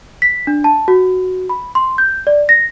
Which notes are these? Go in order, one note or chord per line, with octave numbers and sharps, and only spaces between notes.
B6
D4
A5
F#4
B5
C6
G6
D5
A#6